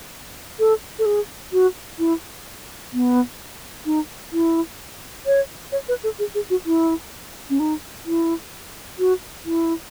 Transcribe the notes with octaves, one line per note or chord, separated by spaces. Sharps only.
A4
A4
G#4
F#4
E4
B3
D#4
E4
C#5
C#5
B4
A4
G#4
G#4
F#4
E4
C#4
D#4
E4
F#4
E4